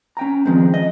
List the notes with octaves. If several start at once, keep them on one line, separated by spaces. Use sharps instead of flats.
C#4 G5 A#5
D#3 F3 G#3 C4
D#5